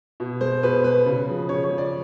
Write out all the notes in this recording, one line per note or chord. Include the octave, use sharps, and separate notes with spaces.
B2
G#3 C5
B2 B4
G#3 B4
C#3
F3 G#3
C#3 C#5
C#5
F3 G#3
D5